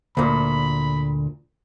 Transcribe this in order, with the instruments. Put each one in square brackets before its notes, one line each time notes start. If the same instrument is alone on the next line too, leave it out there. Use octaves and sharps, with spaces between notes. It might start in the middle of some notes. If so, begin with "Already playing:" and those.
[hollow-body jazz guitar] D2 A#2 [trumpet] B5